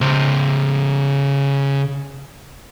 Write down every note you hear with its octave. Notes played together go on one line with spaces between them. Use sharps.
C#3 C5